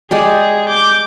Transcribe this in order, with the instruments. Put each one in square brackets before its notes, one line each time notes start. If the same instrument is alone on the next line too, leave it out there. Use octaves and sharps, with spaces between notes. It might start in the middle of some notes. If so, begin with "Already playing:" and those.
[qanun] G#3 G4 D5 [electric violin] G#4
[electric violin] D6 G6